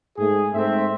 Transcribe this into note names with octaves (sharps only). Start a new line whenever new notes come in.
G#2 A3 G#4
G#2 A3 C4 E5